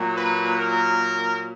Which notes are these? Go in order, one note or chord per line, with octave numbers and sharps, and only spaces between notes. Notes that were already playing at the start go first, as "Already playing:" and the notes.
Already playing: A#2 F#3
B4
A#4